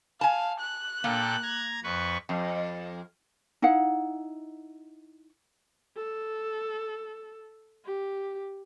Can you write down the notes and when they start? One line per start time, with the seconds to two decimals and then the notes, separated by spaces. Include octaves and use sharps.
0.21 F5 G#5 A5
0.60 F#6
1.04 A#2 A#3 A4 G5
1.43 A#5 G#6
1.84 F2 B4 C#6
2.29 F2
3.62 D#4 E4 F5 F#5
5.96 A4
7.85 G4